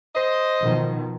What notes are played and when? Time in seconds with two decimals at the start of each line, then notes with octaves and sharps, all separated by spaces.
0.15 C5 D#5
0.62 B2 D#3 F3